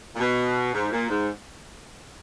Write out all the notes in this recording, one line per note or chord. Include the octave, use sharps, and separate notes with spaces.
A#2
B2
G#2
A#2
G#2